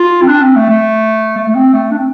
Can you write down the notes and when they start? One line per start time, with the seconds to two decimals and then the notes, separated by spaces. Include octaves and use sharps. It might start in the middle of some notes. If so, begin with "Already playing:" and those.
Already playing: F4
0.22 C4
0.28 D4
0.42 C4
0.56 A3
0.69 A3
1.37 A3
1.48 A3
1.55 C4
1.73 A3
1.91 D4
1.98 C4